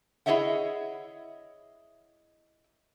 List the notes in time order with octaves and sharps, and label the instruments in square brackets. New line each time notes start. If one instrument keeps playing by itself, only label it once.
[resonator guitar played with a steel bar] E4 G#4 C#5 D#5 E5 F#5